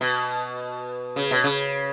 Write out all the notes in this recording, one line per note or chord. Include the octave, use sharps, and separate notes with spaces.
B2
C#3
B2
C#3